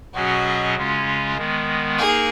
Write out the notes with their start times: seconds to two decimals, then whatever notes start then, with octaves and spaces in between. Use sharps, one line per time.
0.14 B2 F#3 C#4 F#4 G#4 D#5
0.76 C#3 G#3 C#4 F4
1.38 D#3 G#3 B3
1.99 A#3 D#4 G#4 A#4